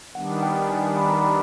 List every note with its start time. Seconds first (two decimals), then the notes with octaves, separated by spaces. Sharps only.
0.15 D#3 G3 B3 D4 F#5
0.43 G5
0.60 G5
0.70 G#5
0.97 B5
1.09 A#5
1.22 B5